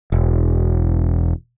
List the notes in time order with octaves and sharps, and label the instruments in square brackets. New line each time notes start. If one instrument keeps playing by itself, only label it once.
[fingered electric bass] E1